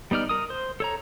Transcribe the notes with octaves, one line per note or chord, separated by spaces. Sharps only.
G3 B3 D#4 D5 F6
A#4 D#6
C5
A4 C#5 A#5